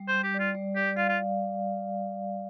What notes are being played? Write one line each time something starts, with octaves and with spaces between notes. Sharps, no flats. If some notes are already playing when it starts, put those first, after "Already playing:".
Already playing: G3
C5
G3
G4
D5
F4
G3
G4 D5
F4 F5
F4